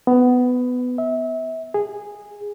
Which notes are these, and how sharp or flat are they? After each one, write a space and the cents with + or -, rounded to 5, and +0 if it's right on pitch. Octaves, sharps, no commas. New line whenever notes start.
B3 +15
E5 -30
G#4 -10